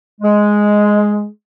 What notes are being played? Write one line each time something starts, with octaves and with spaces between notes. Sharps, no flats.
G#3